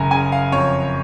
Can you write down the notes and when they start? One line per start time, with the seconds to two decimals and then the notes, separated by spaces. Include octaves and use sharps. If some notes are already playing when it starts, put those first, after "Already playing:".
Already playing: F#1 G#5 A#5
0.11 C#3 G#5
0.32 F5
0.51 F2 C#5